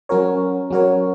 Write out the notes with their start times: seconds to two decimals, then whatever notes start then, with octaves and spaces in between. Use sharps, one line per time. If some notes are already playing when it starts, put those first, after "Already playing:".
0.09 F#3 C#4 F#4 A#4 C#5
0.70 F#3 C#4 F#4 A#4 C#5